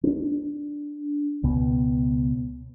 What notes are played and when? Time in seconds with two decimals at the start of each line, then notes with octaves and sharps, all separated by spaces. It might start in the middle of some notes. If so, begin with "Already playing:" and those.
0.04 C#4 D4
1.43 C#2 B2